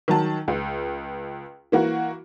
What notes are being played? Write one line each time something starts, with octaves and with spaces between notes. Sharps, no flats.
D#3 F#3 A5
C#2
E3 A#3 F#4